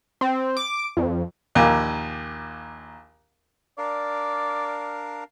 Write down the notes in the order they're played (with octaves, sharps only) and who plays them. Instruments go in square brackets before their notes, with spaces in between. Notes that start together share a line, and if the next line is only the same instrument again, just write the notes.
[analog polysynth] C4
D6
F2
[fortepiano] A#1 D#2
[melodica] D4 A#4 F5 [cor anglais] D5